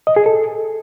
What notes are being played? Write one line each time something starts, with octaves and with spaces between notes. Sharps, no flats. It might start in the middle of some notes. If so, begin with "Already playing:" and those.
D#5
G#4
A4